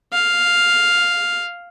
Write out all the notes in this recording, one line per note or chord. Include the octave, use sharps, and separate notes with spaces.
F5